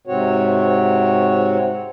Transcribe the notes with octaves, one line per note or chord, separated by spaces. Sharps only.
G#2 C3 C4 F#4 C#5